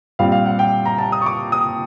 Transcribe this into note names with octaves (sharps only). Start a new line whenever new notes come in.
A#2 G3 C4 F5
F5
F#5
G5
A#5
A5
D#6
C#6
D6
D#6